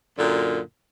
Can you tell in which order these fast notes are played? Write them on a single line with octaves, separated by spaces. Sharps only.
F#2 D3 A#2